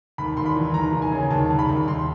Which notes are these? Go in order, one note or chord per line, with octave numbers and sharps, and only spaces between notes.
D#2 B5
D#2 C6
B5
E3
D#2 A#5
D#2
G#5
C#3
D#2 A5
D#2
B5
D#2
D#2 C6